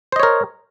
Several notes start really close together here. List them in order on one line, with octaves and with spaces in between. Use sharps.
C5 D#5 C#5 A#4